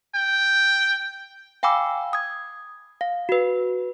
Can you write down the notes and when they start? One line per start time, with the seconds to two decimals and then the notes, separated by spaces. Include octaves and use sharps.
0.15 G5
1.63 F5 G5 G#5 B5 D6 E6
2.13 D#6 G#6
3.01 F5
3.29 F#4 B4